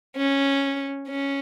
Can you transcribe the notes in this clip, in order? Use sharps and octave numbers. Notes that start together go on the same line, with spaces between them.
C#4
C#4